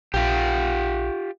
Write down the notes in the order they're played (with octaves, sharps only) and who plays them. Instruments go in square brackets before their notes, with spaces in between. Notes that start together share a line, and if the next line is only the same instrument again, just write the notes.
[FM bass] A#1 [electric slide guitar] F4 G4